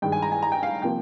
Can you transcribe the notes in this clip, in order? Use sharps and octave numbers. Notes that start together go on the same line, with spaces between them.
G2 D#3 G#3 G5
G#5
A#5
G#5
A#5
G5
F5
C3 F3 A#3 G5